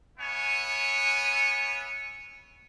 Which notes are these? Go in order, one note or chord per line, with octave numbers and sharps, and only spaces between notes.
B3 E4 C#5 G#5